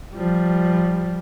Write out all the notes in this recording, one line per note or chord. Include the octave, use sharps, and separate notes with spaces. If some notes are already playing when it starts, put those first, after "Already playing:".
F3 G3